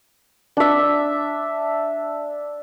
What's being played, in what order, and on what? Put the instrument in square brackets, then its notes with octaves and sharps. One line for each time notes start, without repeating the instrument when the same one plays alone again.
[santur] D4 E5